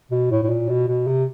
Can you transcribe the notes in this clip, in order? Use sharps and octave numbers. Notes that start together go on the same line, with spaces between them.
B2
A2
A2
A#2
B2
B2
C3